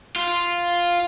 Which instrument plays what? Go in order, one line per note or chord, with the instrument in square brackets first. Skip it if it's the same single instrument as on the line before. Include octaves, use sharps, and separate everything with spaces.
[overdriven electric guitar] F4